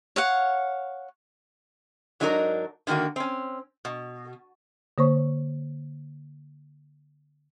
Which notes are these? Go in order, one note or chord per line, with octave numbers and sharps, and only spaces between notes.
C#5 F5 F#5
G#2 F#3 D4 D#4 G#4 A#4
D3 D#3 F#3 A#3 F#4
C4 C#4
B2
D3 A#3 C5 C#5 C#6